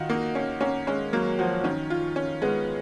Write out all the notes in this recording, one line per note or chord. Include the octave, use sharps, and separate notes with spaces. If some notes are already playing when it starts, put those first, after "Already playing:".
Already playing: D#3 F4 F#4
A#3 D#4
C#4
A#3 C#4
G#3 C#4
F#3 A#3
F3 F#4
D#3 C#4
F4
C#4
G#3 B3